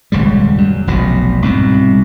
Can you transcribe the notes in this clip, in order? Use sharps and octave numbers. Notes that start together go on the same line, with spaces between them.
D#1 C#2 C#3 G3
F#2
F1 B1 B2
C2 G#2 B2